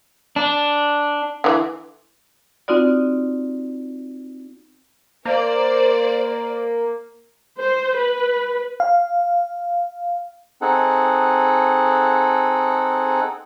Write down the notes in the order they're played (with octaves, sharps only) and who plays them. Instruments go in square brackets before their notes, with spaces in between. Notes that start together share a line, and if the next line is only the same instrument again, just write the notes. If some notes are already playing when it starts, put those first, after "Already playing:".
[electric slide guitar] D4
[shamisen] D3 E3
[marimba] C4 D#4 F4 F#4 D5
[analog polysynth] A#3 [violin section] C5 D5
[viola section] C5
B4
[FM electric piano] F5
[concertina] C4 D#4 G#4 A4 F#5